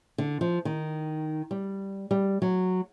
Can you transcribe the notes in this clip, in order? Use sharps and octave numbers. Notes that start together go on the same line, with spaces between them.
D3
F3
D#3
G3
G3
F#3